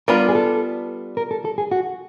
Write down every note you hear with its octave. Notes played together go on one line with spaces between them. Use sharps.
G3 B3 D4 F4 A#4
G#4
A4
A#4
A4
A4
G#4
F#4